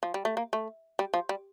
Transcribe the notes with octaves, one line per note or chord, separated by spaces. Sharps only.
F3
G3
A3
A#3
A3
G3
F3
G3